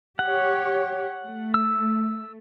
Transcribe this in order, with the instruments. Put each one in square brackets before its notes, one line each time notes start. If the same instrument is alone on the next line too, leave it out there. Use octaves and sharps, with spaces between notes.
[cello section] G4 C#5 [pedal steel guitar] F#5
[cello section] A3
[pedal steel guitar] E6